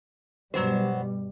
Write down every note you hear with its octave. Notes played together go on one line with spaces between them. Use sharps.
G2 B2 F#3 G3 B3 C5